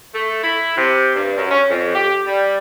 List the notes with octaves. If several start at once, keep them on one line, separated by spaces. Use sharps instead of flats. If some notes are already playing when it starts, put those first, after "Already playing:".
A3
E4
C3
G2
F#2
C#4
F2
G4
G3